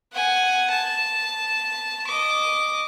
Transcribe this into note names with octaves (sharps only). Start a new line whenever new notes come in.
F#5 G#5
A5
D#5 D6